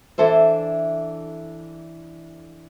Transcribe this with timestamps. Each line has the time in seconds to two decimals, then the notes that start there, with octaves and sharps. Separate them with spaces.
0.18 E3 D4 A4 C5 E5